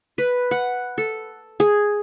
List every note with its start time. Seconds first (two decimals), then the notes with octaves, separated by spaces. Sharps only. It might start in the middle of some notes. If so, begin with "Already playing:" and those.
0.18 B4
0.51 F#5
0.98 A4
1.60 G#4